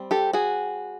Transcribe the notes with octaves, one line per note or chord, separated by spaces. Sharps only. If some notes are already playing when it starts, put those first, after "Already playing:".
Already playing: G3 C4
G4 A4
F#4 G#4